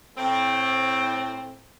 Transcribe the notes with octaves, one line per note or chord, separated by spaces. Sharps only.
A2 C4